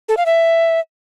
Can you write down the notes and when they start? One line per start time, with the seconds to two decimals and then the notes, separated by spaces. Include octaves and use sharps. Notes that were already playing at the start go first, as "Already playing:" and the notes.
0.09 A4
0.17 F5
0.26 E5